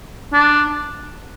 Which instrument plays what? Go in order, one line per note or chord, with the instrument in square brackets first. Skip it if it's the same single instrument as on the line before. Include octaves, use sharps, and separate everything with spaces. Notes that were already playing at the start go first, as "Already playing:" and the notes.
[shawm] D4